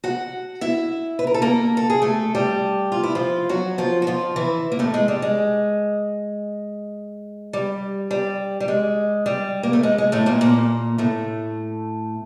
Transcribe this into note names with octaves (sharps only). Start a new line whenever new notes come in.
F#4 F#5
E4 E5
B4
A#4
A4
A#3 A#4
A4
G#4
A3 A4
G3 G4
F4
E4
F3 F4
F#3 F#4
F3 F4
F#4
F3 F4
E3 E4
A#3
A2 A3
G#3
G3
G#3
G3
G3
G3
G#3
G3
A#3
A3
G#3
G#3
A2 A3
A#2 A#3
A#2 A#3
A2 A3